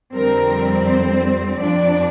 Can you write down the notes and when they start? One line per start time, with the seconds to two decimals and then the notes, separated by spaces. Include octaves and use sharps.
0.14 F2 D3 G3 C4 A#4
0.86 C5
1.57 F2 F3 D4 D5